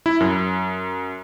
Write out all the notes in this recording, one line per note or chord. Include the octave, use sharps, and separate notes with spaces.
E4
F#2